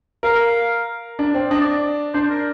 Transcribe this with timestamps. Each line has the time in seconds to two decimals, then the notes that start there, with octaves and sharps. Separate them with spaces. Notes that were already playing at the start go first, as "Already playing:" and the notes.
0.23 A#4 F5
1.19 D4
1.34 C4
1.51 D4 D#5
1.61 D5
2.14 D4 C5
2.30 A#4